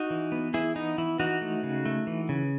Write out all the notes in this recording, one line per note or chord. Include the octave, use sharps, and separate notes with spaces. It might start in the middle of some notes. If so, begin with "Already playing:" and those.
Already playing: D#4 F#4
E3
B3
E3 E4 G#4
B3 D#4
E3 E4
E3 D#4 F#4
A3
C#3
A3
E3
C#3